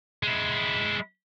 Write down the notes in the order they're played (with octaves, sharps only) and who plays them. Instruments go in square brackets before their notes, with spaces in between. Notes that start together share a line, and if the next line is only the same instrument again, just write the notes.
[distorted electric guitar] G#3 E4